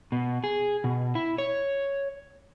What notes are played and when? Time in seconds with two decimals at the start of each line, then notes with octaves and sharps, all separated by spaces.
0.12 B2
0.44 G#4
0.84 B2
1.15 E4
1.38 C#5